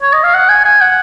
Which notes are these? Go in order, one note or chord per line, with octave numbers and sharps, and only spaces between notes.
C#5
D#5
F5
F#5
G#5
G#5
F#5